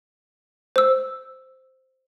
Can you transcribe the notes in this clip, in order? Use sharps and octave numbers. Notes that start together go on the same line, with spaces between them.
C5 E6